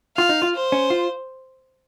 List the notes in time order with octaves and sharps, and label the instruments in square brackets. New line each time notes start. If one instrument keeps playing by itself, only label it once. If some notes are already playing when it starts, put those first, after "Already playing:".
[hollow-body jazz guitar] F4 [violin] F5
[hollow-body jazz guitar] D#4
F4
[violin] C5
[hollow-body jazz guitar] C#4
F4